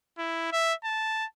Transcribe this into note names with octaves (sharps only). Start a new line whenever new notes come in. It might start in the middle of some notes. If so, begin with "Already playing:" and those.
E4
E5
A5